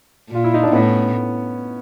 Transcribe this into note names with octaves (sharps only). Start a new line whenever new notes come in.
A#2
F4
E4
D#4
D4
A2 B3 C#4